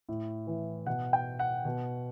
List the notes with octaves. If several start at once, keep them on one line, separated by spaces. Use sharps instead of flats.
A2
E3
B2 F#5
G5
F#5
B2